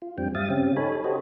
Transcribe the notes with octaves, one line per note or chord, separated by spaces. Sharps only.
F4
F2 G3 C4 D4 G5
G2 G3 E5 F5 D#6 A6
C#3 C4 C#4 G4
D#4 A4 C#5 G#5 B5
F#4 G4 A4 C5 C#5 D#5